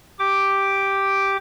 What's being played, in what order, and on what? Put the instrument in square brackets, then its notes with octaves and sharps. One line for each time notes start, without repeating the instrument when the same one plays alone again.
[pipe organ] G4 D6